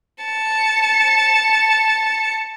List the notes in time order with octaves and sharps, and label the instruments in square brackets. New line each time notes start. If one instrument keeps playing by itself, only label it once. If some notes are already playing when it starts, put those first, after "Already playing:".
[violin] A5 C#7